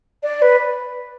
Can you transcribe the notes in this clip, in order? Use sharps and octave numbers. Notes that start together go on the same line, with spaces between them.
D5
B4